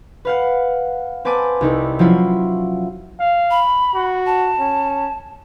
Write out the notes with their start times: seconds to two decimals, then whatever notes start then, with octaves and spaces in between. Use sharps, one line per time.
0.25 B4 F5 F#5
1.25 C4 B4 G#5 A5 D6 D#7
1.61 C2 D#4 E4
1.99 F3 F#3 C#4 E4 F4
3.20 F5
3.51 B5
3.95 F#4
4.26 A5
4.60 C#4